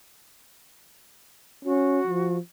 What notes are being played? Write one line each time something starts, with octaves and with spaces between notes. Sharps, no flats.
C#4 F#4
F3